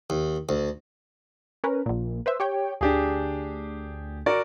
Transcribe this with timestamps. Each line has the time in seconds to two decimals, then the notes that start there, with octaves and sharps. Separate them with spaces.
0.10 D#2
0.49 D2
1.64 C#4 A#4 B4
1.86 A#1 A#2
2.26 B4 C5 E5
2.40 G4 C#5 G5
2.81 D2 D4 G4 G#4
4.26 F#4 A#4 D5